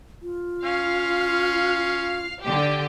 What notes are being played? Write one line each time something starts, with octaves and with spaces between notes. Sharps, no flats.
F4
C#4 F5
D3 G4